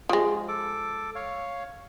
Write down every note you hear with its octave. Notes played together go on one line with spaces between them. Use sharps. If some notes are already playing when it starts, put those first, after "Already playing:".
F3 G#3
A4 D6
C#5 F5